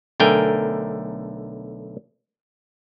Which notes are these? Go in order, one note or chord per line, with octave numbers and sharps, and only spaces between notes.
B1 D3 A3 A#4 G5 G#5